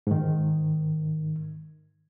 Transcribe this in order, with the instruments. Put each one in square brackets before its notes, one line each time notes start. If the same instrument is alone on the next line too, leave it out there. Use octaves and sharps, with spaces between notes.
[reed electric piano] G#2 D#3